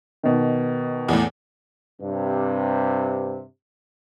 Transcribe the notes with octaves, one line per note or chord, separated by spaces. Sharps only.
B2 D#3
E2 A2
G2 C3